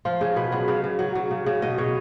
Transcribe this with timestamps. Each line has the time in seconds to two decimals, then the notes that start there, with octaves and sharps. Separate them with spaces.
0.05 F3 F4
0.21 C#3 G#4
0.36 B2 B4
0.52 F#3 B4
0.68 C#3 F5
0.84 C#3
0.99 F#3
1.15 F#3
1.31 C#3
1.46 C#3
1.62 B2 D#5
1.78 B2 C#5